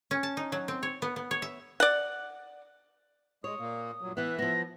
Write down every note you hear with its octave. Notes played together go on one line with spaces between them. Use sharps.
C#4
A5
D#4
F#3
C4
C#5
B3
B3
C#5
E5
D5 F#5
G#3 C#5 D#6
A#2 A#3
G2 A#2 F#3
E3 B3 E5 F#6
F3 B3 A#6